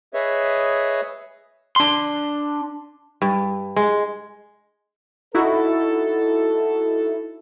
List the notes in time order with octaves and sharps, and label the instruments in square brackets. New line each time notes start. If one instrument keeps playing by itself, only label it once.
[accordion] G#4 B4 C#5 D#5 E5
[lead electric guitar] D4 C6
[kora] G2
G#3
[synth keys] D#4 E4 F#4 [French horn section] A4